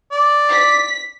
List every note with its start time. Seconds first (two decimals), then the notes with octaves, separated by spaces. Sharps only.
0.12 D5
0.52 B6